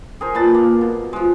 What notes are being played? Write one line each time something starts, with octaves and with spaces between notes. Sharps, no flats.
G#4 A#4 C5
A#2 B4 A5
A#3
B2
F3 G#3